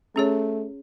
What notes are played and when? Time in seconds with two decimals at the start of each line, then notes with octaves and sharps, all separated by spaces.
0.16 A3 C#4 G#4 C#5